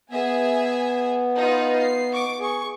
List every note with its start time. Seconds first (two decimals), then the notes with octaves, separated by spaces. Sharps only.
0.11 B3 G#4 E5 G#5
1.36 D#4 F4 B4
1.77 C7
2.11 C#6 D6
2.40 G#4 C#6